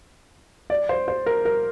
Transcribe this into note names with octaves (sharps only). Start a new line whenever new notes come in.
D5
C5
C5
A#4
A#4